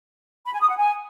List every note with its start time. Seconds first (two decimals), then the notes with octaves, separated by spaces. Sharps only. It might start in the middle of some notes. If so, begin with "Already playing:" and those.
0.46 B5
0.54 G#5
0.62 D#6
0.69 F#5
0.77 G#5